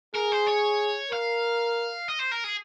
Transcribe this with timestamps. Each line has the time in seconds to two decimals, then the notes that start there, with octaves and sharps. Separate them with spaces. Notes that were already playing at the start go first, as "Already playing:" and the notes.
0.14 G#4 A#4
0.32 C5
0.47 C#5
1.11 A#4 F5
2.08 D#5
2.19 C5
2.32 A#4
2.44 G#4